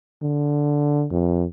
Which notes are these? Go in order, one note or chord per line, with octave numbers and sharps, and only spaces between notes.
D3
F2